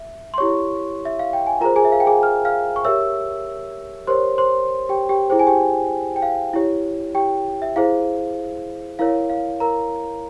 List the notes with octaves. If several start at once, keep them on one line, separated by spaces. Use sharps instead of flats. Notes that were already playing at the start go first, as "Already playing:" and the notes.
Already playing: E5
C6
E4 G4 C#5 C#6
E5
F5
G5
G#5
F4 G#4 A#4 C5 A#5
G#4 G#5
E5
F5
G5
G#4 G#5
F6
F5 F6
C#6
G4 A#4 C#5 E5 E6
G4 A#4 C5 C#5 C6
C5 C6
G4 G5
G4 G5
E4 G#4 C5 G5
G#5
G4 G5
G5
F5
E4 G4 C#5
G4 G5
E5
E4 G#4 C5 F5
E4 A#4 C#5 F5
F5
A#4 A#5